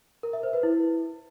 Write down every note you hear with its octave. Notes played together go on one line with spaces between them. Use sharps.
A#4
E5
C5
B4
E4